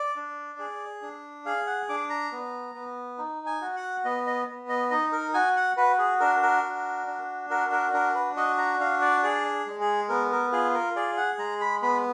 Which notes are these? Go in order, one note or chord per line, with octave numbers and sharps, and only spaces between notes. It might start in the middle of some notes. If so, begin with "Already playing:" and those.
Already playing: D5
D4
G#4
D4
G#4 F5
F#5
D4 D6
A#5
B3
B3
D#4
G#5
F#4
F#5
B3 D#5
D#5
B3
D#5
D#4 D#5
A#4
F#4 G#5
F#5
F#4 B4
G#4
D4 A#4
A#4
F#4
D4
F#4 A#4
A#4
D4 A#4
B4
F#4 D#5
A#5
D4 F5
D5
G#4 D5
G#3
G#4
B3 A#4
A#4
F4 G#4
A#4
G#4 D5
F#5
G#3 A#5
B5
B3 B5